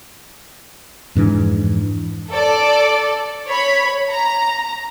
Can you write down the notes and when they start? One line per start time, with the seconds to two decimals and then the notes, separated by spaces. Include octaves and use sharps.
1.15 F2 G#2 E3 D4
2.30 A4 D5
3.47 C#5 B5
4.10 A#5